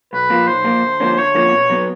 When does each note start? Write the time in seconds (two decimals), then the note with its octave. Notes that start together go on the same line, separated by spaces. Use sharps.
0.13 B1 B4
0.30 A#2 F3 A#3
0.47 B1 C5
0.65 A#2 F3 A#3
0.83 D2
1.00 D3 F3 A#3 C#4
1.17 D2 C#5
1.35 D3 F3 A#3 C#4
1.52 B2
1.70 F#3 B3